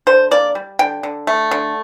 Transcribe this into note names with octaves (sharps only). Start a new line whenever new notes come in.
D3 C5
A#3 D5
G3
D3 G5
D3
A3
D3